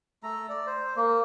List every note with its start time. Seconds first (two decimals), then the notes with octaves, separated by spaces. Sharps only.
0.23 A3 A4 A#5
0.49 D5
0.67 C5
0.96 A#3